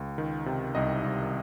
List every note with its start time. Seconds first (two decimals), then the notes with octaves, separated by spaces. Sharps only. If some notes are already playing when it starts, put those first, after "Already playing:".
Already playing: C#2
0.18 D#3
0.46 C3
0.75 C2 D#5
1.04 C2